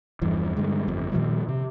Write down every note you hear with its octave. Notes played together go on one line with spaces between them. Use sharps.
E2 G2 E3 F3
G2 D3 G#3
G1 F2
A#2 D#3 F3 G3
C3